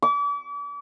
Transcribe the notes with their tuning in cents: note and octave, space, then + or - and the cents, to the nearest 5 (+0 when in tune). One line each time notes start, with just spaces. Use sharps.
D6 -40